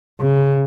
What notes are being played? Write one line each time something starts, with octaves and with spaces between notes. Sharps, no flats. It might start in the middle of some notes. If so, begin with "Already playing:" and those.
C#3